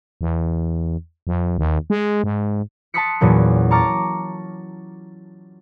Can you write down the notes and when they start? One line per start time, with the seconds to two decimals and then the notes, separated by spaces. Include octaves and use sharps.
0.21 E2
1.27 F2
1.58 D#2
1.90 G#3
2.24 G#2
2.94 A5 C6 D#6 F#6 B6 C#7
3.21 E2 A#2 F#3 C#4
3.71 A5 A#5 C#6 D6 F6 A6